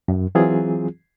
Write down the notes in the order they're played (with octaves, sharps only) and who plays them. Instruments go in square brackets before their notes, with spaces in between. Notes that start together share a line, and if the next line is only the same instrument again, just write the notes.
[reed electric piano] F#2
E3 F#3 C4 F4 G#4